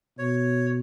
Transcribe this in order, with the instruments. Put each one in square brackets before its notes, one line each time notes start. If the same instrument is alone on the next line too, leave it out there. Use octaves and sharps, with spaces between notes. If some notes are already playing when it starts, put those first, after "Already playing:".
[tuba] B2 [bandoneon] C#5